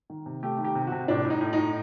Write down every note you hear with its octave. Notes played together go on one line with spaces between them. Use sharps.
D#3
C3
A3 G4
D#3
G4
C3
C3 F#4
A2 D4
A2
D#4
A2
A2 D#4